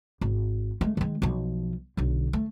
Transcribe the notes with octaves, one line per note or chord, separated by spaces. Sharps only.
G#1
G#3 A3
D#3 G#3
B1 F3
B1 D3
A3